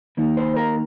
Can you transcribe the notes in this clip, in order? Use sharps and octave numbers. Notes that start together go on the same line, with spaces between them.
D#3 A#3 D#4
C5
A#4